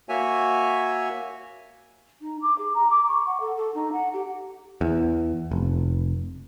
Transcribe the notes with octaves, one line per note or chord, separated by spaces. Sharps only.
A#3 F#4 C#5 E5 G#5
D#4
D6
G#4
A#5
D6
C#6
F#5
A4
A4
D#4
F#5
G4
E2
F1